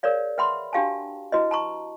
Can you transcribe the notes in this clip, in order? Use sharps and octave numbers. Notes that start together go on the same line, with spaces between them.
G#4 A#4 C#5 D5 F5
B4 E5 F#5 B5 C6
D4 F#4 G4 F5 G5 A5
E4 F#4 B4 D#5
A5 A#5 C#6